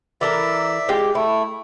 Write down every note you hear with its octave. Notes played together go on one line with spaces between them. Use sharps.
E3 A4 A#4 D5 E5
G#3 F4 G4
A3 E4